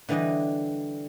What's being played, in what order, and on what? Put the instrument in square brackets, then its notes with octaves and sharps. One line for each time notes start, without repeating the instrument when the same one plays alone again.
[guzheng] D3 E3 G3 D5 D#5